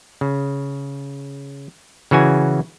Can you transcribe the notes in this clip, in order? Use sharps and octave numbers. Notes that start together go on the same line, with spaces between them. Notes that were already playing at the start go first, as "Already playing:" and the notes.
C#3
C#3 E3 F#4 G#5